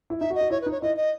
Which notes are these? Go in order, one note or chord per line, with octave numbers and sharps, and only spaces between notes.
E4
D#4 E5
F#4
D#5
F#4
E4 C#5
B4
D#4
C#5
E4 D#5
D#5